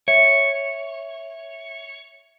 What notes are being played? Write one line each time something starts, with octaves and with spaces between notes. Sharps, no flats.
C#5 E5